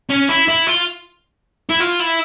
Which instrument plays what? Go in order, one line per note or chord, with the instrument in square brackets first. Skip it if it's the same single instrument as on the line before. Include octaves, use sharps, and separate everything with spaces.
[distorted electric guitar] C#4
E4
E4
F4
E4
F4
E4